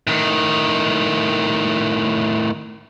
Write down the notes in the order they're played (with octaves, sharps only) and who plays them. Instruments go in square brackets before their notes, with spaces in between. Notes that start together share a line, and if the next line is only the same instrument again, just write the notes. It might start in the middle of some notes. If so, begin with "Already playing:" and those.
[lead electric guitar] A2 D#3